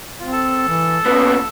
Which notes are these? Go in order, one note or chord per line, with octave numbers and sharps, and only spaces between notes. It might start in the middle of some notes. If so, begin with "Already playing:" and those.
C4 F4
A4 A5
E3
A#2 B3 C#4